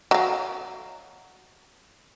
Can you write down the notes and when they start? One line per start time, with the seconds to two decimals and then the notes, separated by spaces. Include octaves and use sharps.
0.11 F#3 F5